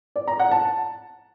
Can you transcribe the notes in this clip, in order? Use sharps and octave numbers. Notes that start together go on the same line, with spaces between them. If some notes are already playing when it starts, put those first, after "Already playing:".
D5
A#5
F#5
A5